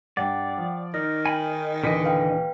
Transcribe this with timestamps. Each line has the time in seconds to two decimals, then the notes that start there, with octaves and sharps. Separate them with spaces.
0.17 G2 D5 F#5 G5
0.57 F3
0.94 D#3 D#4 F6 A#6
1.26 G5 G#5 B5
1.84 D#1 D3 E3 D#5 B6
2.04 B4 F5 G5